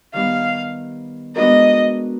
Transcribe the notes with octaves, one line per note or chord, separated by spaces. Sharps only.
D#3 G3 B3 F5
G#3 B3 D4 F#4 A#4 D#5